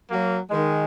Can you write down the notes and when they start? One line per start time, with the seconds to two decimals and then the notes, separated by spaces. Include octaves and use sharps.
0.10 F#3 A#3
0.50 D#3 G#3